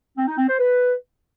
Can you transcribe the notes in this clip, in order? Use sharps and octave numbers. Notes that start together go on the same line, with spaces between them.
C4
D#4
C4
C5
B4